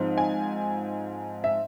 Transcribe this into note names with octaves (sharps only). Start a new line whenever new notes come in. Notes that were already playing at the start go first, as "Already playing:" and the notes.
Already playing: G#2 F3 C4
G#5
E5